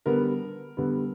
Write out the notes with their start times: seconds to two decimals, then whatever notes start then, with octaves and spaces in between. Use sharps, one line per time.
0.06 D3 G3 B3 A#4
0.77 D3 G3 B3